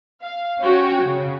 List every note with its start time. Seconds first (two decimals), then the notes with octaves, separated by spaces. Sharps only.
0.22 F5
0.62 C#4 F#4 C#5 G5
1.03 C#3